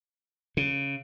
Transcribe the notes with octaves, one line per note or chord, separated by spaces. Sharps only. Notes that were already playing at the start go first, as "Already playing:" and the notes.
C#3